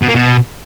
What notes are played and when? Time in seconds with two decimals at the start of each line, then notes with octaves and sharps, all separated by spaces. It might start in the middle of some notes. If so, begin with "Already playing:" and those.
0.02 B2
0.08 A#3
0.15 B2